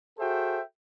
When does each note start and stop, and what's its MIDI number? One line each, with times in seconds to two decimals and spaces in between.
0.18 0.61 66
0.18 0.61 68
0.18 0.61 69
0.18 0.61 72
0.18 0.61 76
0.18 0.61 79